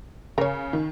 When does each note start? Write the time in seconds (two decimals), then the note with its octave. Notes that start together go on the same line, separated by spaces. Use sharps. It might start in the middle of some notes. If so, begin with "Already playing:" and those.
0.38 C#3 A#4 C#5
0.73 D#3